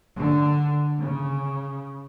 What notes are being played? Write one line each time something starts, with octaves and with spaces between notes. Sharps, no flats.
D3
C#3